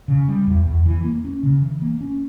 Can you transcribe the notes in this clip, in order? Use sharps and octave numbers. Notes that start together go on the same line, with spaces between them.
C#3
G3
E2
E2
E3
A#3
C#4
C#3
E3
A#3
C#4